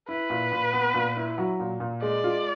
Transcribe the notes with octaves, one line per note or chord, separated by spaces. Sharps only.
E4 B4
A#2
A#2
B3
A#2
E4
F#3
A#2
A#2
G#3 D5
F4